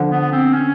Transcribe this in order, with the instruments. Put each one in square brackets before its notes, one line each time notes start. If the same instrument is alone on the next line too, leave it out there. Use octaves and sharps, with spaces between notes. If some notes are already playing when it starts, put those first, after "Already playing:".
Already playing: [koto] D3 F3
[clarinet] B3
C4
C#4